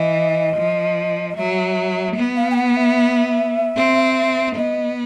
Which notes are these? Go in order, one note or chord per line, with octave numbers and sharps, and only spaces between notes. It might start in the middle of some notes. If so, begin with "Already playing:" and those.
Already playing: E3 D#5
F3
D#5
F#3 E5
B3
F5
G5
F#5
E5
C4
B3 D#5